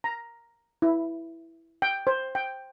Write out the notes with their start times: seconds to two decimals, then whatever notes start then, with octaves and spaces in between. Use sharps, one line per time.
0.04 A#5
0.82 E4
1.82 G5
2.07 C5
2.35 G5